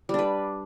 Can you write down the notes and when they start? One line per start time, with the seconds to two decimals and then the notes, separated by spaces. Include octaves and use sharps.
0.09 G3
0.14 D4
0.19 B4